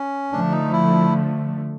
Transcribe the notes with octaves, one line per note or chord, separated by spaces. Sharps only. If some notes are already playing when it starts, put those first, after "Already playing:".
Already playing: C#4
D3 F3 A3 D4
D#4
E4